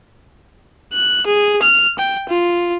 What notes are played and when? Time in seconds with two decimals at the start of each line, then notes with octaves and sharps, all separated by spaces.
0.93 F#6
1.27 G#4
1.63 F6
1.99 G5
2.29 F4